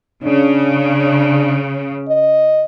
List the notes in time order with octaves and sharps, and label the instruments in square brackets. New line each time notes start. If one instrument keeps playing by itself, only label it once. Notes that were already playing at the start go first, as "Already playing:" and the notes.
[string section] C#3 [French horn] D4
[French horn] D#5